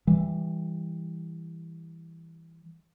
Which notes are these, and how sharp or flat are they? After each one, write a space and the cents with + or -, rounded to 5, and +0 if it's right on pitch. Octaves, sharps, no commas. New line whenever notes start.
E3 +0 G3 +15